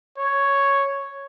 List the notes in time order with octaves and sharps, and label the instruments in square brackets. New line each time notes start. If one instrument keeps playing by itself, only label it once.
[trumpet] C#5